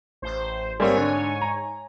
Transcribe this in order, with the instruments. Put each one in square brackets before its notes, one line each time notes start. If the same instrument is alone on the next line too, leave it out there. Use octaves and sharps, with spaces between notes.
[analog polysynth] A1 C5
[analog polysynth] G#2 C#5 G#5 [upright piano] G3 A#3 C4
[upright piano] D3
A#5